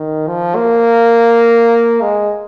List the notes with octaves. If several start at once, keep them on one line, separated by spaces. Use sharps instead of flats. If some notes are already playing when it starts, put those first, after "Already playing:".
Already playing: D#3
F3
A#3
G#3